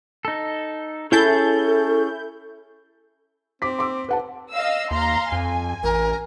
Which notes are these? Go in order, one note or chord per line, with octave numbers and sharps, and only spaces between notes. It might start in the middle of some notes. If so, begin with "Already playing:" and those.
D#4 A4
C#4 E4 G#4 A4 A5 G6
C4 D6 B6
C6 D6 E6
B4 F#5 A5
D#5 F5 E6
D#2 F5 A#5 C6
F2 G#5
A1 A#4